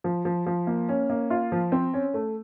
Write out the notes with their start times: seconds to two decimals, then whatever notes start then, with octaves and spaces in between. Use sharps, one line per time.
0.04 F3
0.25 F3
0.46 F3
0.67 A#3
0.89 C#4
1.10 A#3
1.30 F4
1.52 F3
1.72 C4
1.94 C#4
2.14 A3